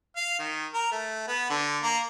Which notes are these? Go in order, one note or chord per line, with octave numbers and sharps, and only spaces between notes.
F5
D#3
A#4
A3
B3
D3
A#3